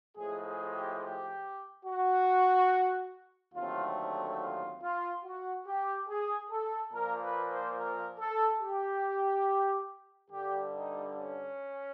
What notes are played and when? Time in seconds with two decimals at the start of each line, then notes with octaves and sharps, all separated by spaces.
0.17 A2 F3 G#3 G#4
0.45 G#4
0.74 G4
1.02 G4
1.86 F#4
3.55 D#2 D3 F#3 A3 C4 F4
4.40 F4
4.82 F4
5.24 F#4
5.66 G4
6.09 G#4
6.51 A4
6.93 A#2 F3 A#3 A#4
7.21 B4
7.49 C5
7.77 A#4
8.19 A4
8.61 G4
10.31 G2 D3 G3 G4
10.73 D#4
11.15 C#4